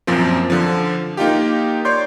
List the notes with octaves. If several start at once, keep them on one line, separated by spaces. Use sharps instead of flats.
F#2 A#2 F3 A#3 C4
D3 F3
A#3 D#4 F4 G4
C#5 D5 C6 G6